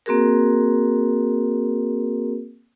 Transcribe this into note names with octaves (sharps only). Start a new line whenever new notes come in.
A#3 C4 F#4 G#4 A#4